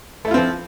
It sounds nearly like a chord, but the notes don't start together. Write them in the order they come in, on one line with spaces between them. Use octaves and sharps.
A3 E4 F4 C4 F3